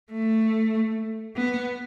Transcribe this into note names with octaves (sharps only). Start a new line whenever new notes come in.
A3
B3